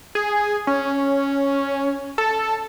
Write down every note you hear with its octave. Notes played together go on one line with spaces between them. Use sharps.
G#4
C#4
A4